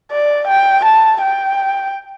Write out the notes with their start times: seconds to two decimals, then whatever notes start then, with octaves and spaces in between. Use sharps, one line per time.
0.12 D5
0.48 G5
0.85 A5
1.21 G5